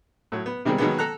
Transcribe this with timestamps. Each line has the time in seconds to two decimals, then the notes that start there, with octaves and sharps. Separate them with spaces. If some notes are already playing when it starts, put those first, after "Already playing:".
0.32 A2 F#3
0.46 B3
0.65 C3 D#3 G3 G#3 C4
0.78 B2 D#3 F#3 G#3 A#3 B3
0.99 A4 A#5 F#6